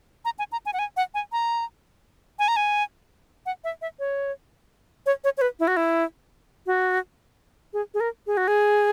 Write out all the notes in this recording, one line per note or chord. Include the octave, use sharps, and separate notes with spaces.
A#5
G#5
A#5
G#5
F#5
G#5
F#5
G#5
A#5
G#5
A#5
G#5
F#5
E5
E5
C#5
C#5
C#5
C#5
B4
E4
F#4
E4
F#4
G#4
G#4
A#4
G#4
F#4
G#4